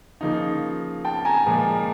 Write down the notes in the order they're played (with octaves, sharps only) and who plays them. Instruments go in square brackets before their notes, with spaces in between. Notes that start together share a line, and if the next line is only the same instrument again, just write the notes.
[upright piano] C#3 F3 A#3 D#4
[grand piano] G5 A5
G#5 A#5
[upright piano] A#2 F3 G#3